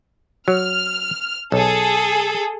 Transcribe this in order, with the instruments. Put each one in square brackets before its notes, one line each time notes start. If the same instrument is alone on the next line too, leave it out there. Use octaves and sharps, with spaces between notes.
[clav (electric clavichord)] F#3 [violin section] F6
[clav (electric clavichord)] B1 [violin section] G#4 A4